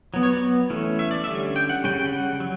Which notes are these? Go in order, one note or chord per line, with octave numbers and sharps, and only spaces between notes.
F#3 B3
C#5
D5
E3 A3 C#4
E5
D5
D3 G3 C#4 E5
G5
F#5
C#3 G3 C#4 G5
G5
F#5
F#3